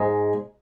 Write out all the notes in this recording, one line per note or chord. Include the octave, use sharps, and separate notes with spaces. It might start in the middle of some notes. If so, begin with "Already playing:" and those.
Already playing: G#2 G#3